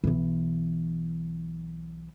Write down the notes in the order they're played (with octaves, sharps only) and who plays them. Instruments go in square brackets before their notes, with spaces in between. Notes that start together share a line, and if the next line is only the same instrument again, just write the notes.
[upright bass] B1 E3